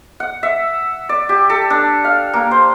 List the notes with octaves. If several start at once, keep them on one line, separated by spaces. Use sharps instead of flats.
F#5
E5
D5
G4
A4
D4
F5
A#3
C5